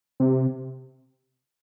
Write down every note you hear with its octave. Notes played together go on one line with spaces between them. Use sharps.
C3